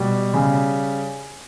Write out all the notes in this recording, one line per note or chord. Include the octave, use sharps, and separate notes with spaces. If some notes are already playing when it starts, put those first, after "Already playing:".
Already playing: B2 G3
C#3